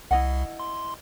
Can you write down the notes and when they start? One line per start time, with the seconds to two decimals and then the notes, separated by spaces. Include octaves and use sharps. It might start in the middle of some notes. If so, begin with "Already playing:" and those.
0.11 C2 E4 D#5 F#5
0.60 C6